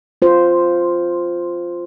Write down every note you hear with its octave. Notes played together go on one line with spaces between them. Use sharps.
F4 C5